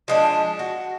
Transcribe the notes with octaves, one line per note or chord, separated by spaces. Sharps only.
F3 G#3 D4
F#4